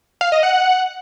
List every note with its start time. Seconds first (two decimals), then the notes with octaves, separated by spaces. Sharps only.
0.21 F5
0.32 D#5
0.43 F#5